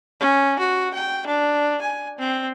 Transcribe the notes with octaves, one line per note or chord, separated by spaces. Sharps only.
C#4
F#4
G5
D4
G#5
C4